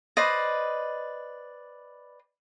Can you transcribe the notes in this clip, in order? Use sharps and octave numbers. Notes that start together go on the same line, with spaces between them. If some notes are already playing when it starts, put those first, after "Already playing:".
B4 C5 D5 D#5